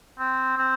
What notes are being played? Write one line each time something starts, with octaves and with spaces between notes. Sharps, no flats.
C4
C4